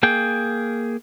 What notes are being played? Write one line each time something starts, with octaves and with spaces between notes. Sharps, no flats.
A#3 G#4 G5